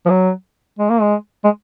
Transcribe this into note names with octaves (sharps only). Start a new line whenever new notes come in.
F3
F#3
G#3
A#3
G#3
G#3